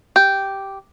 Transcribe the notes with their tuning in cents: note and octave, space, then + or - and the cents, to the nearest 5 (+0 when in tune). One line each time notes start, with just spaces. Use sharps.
G4 -5